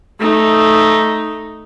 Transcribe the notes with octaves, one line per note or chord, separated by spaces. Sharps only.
A3 D#4